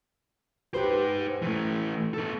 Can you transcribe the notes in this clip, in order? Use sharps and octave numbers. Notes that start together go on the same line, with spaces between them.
D#4 G4 B4 C5
E3 A3
B3 A4